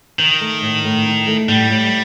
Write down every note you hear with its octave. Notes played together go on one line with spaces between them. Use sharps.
D#3 D#4
A3
A2
A2
D#4
A3
A2 G3
A2